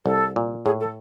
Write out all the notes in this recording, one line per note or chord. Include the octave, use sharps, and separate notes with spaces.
C2 A4
A#2
A2 G#4
A4